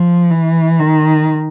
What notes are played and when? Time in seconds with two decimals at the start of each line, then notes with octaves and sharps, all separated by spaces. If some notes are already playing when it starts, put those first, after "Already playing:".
Already playing: F3
0.31 E3
0.80 D#3